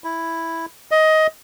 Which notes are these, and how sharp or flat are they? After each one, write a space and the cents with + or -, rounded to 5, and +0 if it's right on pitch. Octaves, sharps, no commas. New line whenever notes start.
E4 +0
D#5 +15